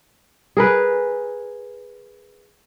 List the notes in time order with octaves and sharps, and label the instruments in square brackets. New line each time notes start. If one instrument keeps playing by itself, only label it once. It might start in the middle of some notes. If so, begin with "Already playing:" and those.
[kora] G#4 A#4 B4